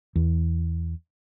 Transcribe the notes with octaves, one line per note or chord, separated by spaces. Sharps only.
E2